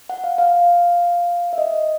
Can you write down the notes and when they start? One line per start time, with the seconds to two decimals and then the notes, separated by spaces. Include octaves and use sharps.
0.09 F#5
0.24 F5
0.38 F5
1.53 E5
1.58 D#5